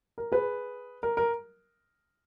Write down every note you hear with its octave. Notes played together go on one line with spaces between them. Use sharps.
A#4
G#4 B4
A#4
A#4